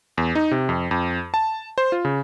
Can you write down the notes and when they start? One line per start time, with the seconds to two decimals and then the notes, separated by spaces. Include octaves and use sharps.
0.18 E2
0.35 D#4
0.51 C3
0.69 F2
0.91 F2
1.34 A5
1.78 C5
1.92 F4
2.05 C#3